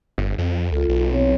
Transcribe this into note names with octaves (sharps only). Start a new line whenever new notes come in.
G1
F2
C#2 F4 A4
B1
C4 E4 C#5